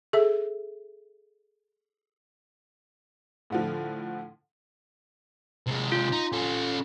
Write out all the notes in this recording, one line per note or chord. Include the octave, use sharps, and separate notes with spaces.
G#4 A4 E5
A2 D3 F3
C3 G#3
F4
D#4
C#4 A4